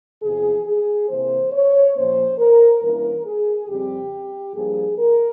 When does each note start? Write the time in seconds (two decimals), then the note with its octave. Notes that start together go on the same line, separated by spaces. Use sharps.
0.22 E2 C3 F3 G#4
0.66 G#4
1.09 C3 E3 A#3 C5
1.52 C#5
1.96 A#2 F3 A#3 C#4 C5
2.39 A#4
2.82 G2 E3 A#3 C#4 A#4
3.25 G#4
3.68 F2 C#3 G3 C4 G4
4.54 G2 F3 A#3 G#4
4.98 A#4